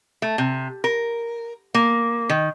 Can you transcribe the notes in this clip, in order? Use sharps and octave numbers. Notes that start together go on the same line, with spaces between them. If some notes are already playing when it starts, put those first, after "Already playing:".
A3
C3
A#4
A#3
D#3